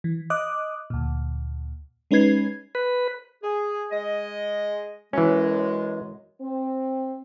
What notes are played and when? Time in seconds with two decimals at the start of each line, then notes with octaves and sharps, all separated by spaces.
0.04 E3
0.30 D#5 D6 D#6 F#6
0.90 D2 A#2
2.11 G#3 C#4 D#4 B4 G#6 C7
2.75 B4
3.43 G#4
3.91 G#3 D#5
5.13 F#2 E3 G#3 C#4
6.41 C4